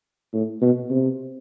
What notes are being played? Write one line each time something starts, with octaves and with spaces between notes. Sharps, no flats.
A2
B2
C3